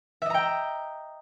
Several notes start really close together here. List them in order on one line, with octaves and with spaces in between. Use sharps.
E5 D#5 A#5 G5